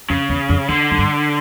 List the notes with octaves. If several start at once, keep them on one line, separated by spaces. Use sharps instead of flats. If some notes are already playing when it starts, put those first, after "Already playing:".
F2 C#3
E2
F2
E2 D3
F#2
G2